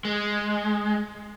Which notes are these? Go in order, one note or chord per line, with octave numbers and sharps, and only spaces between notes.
G#3